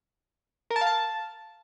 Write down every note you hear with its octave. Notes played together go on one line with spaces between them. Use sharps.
A#4
A5
F5
A5